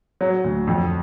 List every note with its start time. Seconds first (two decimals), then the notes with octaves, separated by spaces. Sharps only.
0.21 F#3
0.44 D2
0.67 F2